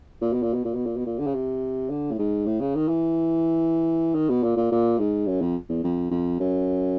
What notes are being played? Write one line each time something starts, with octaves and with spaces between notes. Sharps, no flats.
A#2
B2
A#2
B2
A#2
B2
A#2
B2
A#2
D3
C#3
C3
D3
A2
G#2
A2
C#3
D#3
E3
D#3
B2
A#2
A#2
A#2
G#2
F#2
F2
E2
F2
F2
F#2